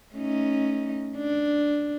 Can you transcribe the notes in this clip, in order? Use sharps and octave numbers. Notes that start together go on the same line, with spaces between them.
A3 C#4 D#4
D4